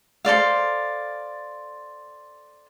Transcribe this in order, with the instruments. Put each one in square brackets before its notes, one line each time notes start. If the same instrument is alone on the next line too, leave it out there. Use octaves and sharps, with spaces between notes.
[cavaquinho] A4 C5 D5 F5